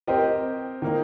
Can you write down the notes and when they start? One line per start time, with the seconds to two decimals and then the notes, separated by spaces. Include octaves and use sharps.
0.07 C4 G4 A#4 D#5
0.82 D#3 A#3 D#4